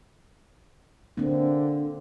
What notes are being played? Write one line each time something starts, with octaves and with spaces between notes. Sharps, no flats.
D3 A#3 C4